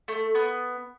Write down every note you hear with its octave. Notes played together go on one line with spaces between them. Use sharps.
A3
B3